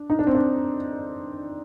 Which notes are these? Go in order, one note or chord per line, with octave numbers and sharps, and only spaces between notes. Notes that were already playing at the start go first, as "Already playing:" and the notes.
Already playing: D4
D#4
D4
C4
D4